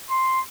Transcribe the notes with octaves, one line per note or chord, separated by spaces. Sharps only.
C6